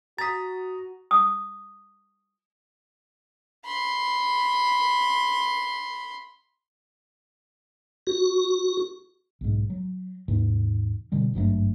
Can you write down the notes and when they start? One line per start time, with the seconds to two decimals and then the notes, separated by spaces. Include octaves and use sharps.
0.18 F#4 A#5 D#6 A6 B6
1.11 D#6
3.65 B5 C6
8.07 F#4
9.41 B1 G#2
9.70 F#3
10.28 D#2 G#2 C3 E3
11.12 B2 D3 G3 C4
11.34 G#1 G2 F#3 A3